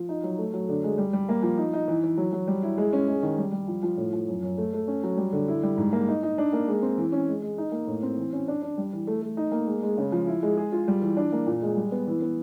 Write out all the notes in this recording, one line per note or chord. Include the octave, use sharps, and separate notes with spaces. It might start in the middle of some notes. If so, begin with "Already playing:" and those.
Already playing: F3
D#4
F#3
A3
F#3
D3
G#3
G3
G3
A#3
F3
D#4
D#4
E3
E3
F#3
F#3
G3
E4
G#3
C#4
G#3
D#3
G3
G3
F3
F3
A2
F3
F#2
F#2
A3
A3
C#4
F#3
G3
D3
E4
G3
G#2
A#3
D#4
D#4
D4
A#3
G#3
C4
E3
C#4
G#3
G#3
D#4
A#3
A2
C4
E3
C#4
D4
D4
G3
E3
A3
A3
D#4
A#3
G#3
G#3
C#3
F3
E4
G#3
G#4
F4
G3
E3
D4
A#3
A#2
G#3
G3
B3
E3
B3